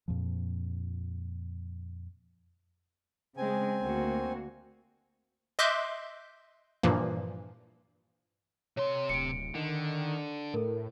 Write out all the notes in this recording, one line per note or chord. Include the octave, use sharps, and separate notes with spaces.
F2 A#2 F3
C#3 G#3 C4 G#5
D2 A#3 F#4
D#5 E5 C6 D6 F#6 G6
G2 A#2 E3 F3 A#3
C3 C#5 C6
D1 C#7 D7
D3 D#3
A2 A4 A#4